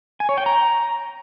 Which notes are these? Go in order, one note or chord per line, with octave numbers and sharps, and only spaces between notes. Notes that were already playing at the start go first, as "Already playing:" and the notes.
G#5
C#5
G5
A#5